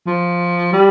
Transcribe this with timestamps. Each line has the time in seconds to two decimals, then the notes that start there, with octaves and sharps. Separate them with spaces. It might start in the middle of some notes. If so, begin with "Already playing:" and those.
0.07 F3
0.73 G3